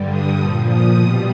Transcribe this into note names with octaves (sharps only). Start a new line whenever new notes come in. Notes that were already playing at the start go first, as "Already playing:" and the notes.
Already playing: G2 D3 G3
D#6
A#2 F3
D#6
B2 G3 D#6